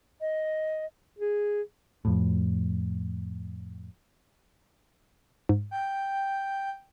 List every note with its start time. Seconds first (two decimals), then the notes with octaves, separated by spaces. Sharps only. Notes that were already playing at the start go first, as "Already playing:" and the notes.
0.20 D#5
1.19 G#4
2.05 F2 A2
5.49 G#2
5.71 G5